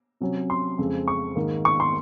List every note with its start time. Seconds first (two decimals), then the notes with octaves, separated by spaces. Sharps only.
0.20 C3 F#3 C#4
0.50 C6
0.79 F2 C#3 G#3 C4
1.08 C#6
1.36 G#2 D#3 A#3
1.65 C#6
1.80 C6